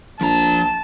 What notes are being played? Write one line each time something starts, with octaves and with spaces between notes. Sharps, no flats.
A#1 F3 A5 A#5